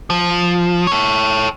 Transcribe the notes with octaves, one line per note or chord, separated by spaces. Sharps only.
F3
A4 C#5